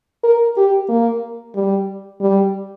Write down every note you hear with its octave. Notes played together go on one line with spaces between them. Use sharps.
A#4
G4
A#3
G3
G3